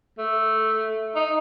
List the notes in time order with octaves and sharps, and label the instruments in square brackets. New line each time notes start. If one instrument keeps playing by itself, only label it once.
[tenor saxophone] A3
D#4